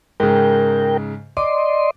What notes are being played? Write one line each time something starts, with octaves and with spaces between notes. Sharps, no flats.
G#2 C#3 A#4 G5
D5 D#5 C6 D6